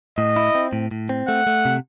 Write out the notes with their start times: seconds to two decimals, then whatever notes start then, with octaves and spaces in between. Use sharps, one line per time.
0.18 A2 D#5
0.36 E4
0.55 C4
0.73 A2
0.91 A2
1.09 C4
1.28 A3 F#5
1.47 A3
1.65 C3